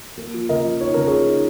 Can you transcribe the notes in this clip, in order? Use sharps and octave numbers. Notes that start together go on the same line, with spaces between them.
A#3
F3
C#3 A#4 D#5
F3
D#4 C#5
C#3 A#4
F3 G#4 C#5
D#4